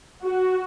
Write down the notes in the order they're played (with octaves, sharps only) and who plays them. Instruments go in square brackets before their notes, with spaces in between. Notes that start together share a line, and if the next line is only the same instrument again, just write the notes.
[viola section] F#4